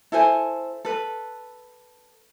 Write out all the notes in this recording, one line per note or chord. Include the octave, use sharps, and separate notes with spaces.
E4 A4 C5 G#5
A4 B4